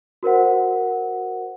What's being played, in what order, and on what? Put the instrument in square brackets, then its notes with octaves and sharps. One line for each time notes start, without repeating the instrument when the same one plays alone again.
[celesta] F#4 A#4 C5 F#5